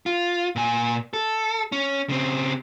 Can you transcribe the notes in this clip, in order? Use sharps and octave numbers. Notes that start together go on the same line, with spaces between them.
F4
A#2 G#5
A4
C#4
C#3 C4